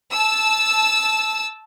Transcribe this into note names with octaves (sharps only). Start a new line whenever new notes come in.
A5 E6